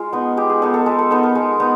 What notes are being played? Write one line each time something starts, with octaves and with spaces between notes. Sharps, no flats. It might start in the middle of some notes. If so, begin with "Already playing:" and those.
Already playing: G#3 F4
B3 D#4
G#3 G4
G#4
B3 D#4 A4
A4
G#3 B4
A4
B3 D#4 A4
A#4
G#3
B3 D#4